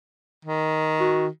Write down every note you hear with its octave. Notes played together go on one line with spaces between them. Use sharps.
D#3
F#4